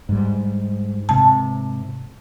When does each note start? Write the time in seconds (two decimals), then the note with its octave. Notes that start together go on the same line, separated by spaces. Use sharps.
0.09 G#2 G3
1.09 G#2 C3 A5